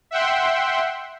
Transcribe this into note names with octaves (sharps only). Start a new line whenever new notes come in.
E5 F#5 G5 C6